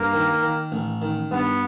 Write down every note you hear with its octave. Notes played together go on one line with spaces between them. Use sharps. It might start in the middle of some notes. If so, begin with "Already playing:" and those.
Already playing: G2 A#3
D#3
D#3
A1
D#3
G2 B3